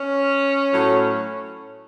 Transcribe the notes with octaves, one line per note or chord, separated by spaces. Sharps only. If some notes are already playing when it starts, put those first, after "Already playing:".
Already playing: C#4
A2 F#3